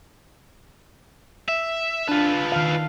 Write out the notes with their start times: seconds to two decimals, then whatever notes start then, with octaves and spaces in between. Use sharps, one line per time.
1.49 E5
2.08 D4 F4 B4 A5 E6
2.52 D#3 F5